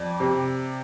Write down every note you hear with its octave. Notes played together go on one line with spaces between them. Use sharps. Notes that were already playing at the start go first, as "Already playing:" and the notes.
Already playing: F2 D5
C3